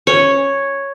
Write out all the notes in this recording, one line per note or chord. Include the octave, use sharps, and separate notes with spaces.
C#4 C#5